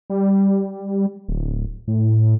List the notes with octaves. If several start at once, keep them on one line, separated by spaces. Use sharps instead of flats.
G3
D1
A2